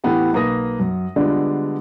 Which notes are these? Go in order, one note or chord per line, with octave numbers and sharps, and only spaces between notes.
A2 E3 A3 B3 G4
B1 A#3 B4 D#6 A#6
F#2
D3 G3 G#3 B3 D4 F4